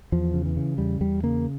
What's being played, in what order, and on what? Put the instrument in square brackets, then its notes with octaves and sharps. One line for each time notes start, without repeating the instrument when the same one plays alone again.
[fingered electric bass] E2 F3
C#3
E3
C#3
E2 G3
E2 G3
C#3 A#3